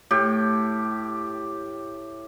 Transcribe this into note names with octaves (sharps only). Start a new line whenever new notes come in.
A2 G4